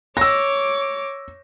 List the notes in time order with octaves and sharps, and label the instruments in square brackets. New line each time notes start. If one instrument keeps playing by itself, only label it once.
[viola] C#5 D6 [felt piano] E6 A#6